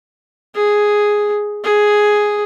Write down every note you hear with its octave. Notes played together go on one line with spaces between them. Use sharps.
G#4
G#4